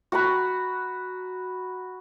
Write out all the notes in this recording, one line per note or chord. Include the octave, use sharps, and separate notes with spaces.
F#4 F#5 A#5 B5